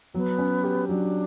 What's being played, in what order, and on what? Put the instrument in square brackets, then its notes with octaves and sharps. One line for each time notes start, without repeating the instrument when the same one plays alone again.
[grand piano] F#3 [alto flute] B3
[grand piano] C#4
G4
[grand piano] F#3 [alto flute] D4